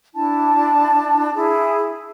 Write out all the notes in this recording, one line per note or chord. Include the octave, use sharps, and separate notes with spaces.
D4 E4 A5
E4 G#4